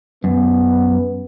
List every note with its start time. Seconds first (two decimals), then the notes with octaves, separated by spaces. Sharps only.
0.24 F#2 B3